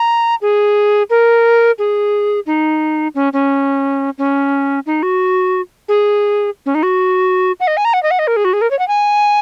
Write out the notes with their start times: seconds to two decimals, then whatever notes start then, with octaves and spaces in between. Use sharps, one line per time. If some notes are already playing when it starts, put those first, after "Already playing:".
Already playing: A#5
0.41 G#4
1.10 A#4
1.78 G#4
2.46 D#4
3.15 C#4
3.33 C#4
4.18 C#4
4.86 D#4
5.03 F#4
5.88 G#4
6.66 C#4
6.75 D#4
6.83 F#4
7.60 F#5
7.67 D#5
7.77 G#5
7.85 A#5
7.93 F#5
8.03 D#5
8.11 F#5
8.19 D#5
8.27 A#4
8.36 G#4
8.45 F#4
8.53 G#4
8.61 A#4
8.71 C#5
8.79 F#5
8.88 G#5